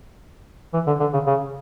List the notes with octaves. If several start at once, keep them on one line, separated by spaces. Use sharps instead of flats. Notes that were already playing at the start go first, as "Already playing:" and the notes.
E3
D3
D3
C#3
C#3